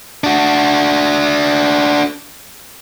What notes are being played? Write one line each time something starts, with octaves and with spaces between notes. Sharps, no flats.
D4 F#4